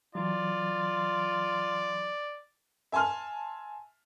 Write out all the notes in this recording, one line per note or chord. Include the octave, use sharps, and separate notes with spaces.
E3 F#3 F4 D5
E5 G#5 A5 C6 F6